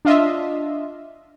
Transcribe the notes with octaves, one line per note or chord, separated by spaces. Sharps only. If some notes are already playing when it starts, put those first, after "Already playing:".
D4 F4 D#5 E5